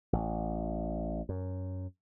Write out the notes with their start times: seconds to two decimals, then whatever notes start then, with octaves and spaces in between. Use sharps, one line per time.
0.13 A1
1.29 F#2